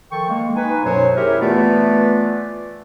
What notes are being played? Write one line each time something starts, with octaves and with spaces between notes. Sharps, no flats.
D#3 F3 A4 G5 C#6
G#3 A#3
D#4 B4 G#5
F#2 B2 F#3 C5 C#5
E4 G4 G#4 A#4 C#5 E5
E3 A3 B3 F4 B4 D5